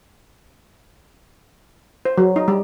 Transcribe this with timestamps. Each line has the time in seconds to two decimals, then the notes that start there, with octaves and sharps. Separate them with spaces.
2.05 C5
2.18 F#3
2.36 D#4
2.48 G3